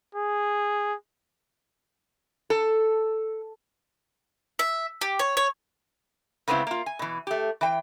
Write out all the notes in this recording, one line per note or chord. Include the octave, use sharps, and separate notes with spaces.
G#4
A4
E5
G4
C#5
C#5
C#3 G#3 B3 C4 D#4 E4
A#3 F4
G#5
B2 E3
A3 G4
E3 G5